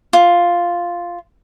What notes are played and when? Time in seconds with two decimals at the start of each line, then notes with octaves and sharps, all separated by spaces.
0.13 F4